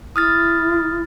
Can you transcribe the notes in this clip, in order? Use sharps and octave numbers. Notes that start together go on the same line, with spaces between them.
E4 D#6 F6 A6